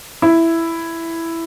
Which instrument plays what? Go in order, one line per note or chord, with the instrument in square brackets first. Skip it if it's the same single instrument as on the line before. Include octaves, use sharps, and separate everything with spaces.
[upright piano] E4